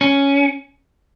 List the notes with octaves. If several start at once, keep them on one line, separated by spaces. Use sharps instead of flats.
C#4